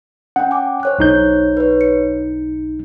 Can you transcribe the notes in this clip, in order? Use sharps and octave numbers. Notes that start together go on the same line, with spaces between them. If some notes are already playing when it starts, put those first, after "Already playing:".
C#4 F#5 G5
G#5 D6
C5 C#5 F#6
B1 D#4 G6
B4 C#5
C#7